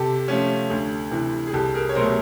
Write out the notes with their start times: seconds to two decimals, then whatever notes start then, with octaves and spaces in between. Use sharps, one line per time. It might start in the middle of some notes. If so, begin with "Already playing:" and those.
Already playing: C3 G4 A4
0.28 F3 A3 C#4
0.70 D2
1.11 C3 E3
1.47 G#4
1.53 C2 G4 A4
1.75 G#4 A#4
1.89 C#5
1.95 B2 F#3 A3 A#4 C5